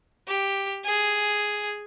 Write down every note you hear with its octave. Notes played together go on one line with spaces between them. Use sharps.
G4
G#4